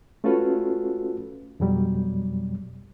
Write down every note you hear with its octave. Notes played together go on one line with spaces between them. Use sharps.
A3 C#4 F4 F#4 A4 B4
F2 B2 F#3 G3